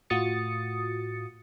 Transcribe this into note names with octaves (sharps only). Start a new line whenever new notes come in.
A2 F4 F#4 D#6 A6 C#7